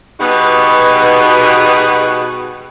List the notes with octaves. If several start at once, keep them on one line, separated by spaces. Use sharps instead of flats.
B2 G3 D#4 F#4 G#4 B4